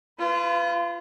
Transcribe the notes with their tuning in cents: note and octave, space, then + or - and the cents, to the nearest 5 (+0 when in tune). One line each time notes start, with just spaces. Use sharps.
F4 -25 B4 +25